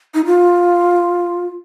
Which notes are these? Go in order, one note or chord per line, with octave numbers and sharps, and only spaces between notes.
D#4
F4